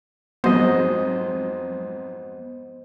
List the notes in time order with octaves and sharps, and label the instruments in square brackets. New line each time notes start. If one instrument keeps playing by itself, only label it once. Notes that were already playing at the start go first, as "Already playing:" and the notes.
[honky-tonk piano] F2 G#2 F#3 [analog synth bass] B3 [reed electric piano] C5 D#5